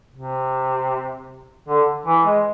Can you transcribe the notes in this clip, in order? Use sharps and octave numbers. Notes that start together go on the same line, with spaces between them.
C3
D3
E3
G#3